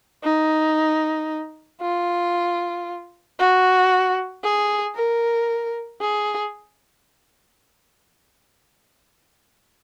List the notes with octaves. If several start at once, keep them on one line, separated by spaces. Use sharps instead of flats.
D#4
F4
F#4
G#4
A#4
G#4